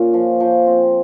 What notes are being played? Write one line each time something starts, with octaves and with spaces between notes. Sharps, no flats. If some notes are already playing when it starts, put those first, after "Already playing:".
Already playing: A#2 C#4
F3
F3
C4